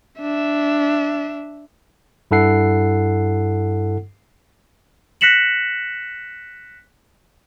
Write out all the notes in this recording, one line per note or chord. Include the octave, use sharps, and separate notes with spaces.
D4 E5
G2 E4 A4 F#5 C7
F#6 A#6 B6 C#7 E7 F#7